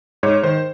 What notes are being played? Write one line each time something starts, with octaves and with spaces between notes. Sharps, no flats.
G#2 C#5
D#3 C5